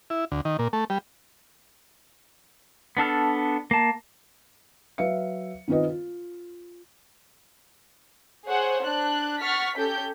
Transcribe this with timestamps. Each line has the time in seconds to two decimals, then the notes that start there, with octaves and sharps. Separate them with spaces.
0.10 E4
0.31 D2
0.45 D#3
0.59 A#2
0.73 A3
0.90 G3
2.97 B3 D4 A4 F6
3.71 A#3 A5
4.98 F#3 B4 E5 F5 C#7
5.68 D#3 C4 F4 B4 D#5
5.89 F4
8.47 G#4 C5 C#5 F#5
8.83 D4 F#6
9.40 F#5 C#6 F6 A6 B6
9.78 C#4 G4 A4 G6